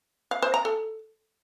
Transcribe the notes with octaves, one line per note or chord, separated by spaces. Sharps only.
F5
C5
A#5
A4